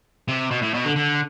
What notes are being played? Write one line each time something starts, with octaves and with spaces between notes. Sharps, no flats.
C3
B2
A2
B2
D3
D3